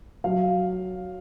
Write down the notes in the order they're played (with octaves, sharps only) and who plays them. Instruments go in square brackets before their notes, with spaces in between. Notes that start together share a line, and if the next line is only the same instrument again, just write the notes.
[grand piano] F#3 F5